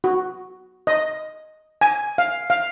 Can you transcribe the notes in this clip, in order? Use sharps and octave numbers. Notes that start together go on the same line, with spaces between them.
F#4
D#5
G#5
F5
F5